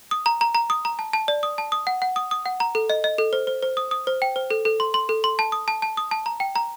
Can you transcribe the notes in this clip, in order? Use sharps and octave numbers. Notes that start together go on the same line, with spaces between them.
D#6
A#5
A#5
A#5
D#6
A#5
A5
A5
D5
D#6
A5
D#6
F#5
F#5
D#6
D#6
F#5
A#5
A4
D#5
D#5
A4
C5
C5
C5
D#6
D#6
C5
G5
C5
A4
A4
C6
C6
A4
C6
A5
D#6
A5
A5
D#6
A5
A#5
G5
A#5